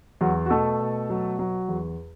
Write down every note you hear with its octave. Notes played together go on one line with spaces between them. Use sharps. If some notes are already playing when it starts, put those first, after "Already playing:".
E2 F#3 F#4
F#4
B2 A3 A4
B2
F#3
F#3
E2